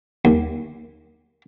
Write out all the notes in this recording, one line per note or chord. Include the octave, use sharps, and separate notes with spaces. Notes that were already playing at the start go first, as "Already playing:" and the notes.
D#2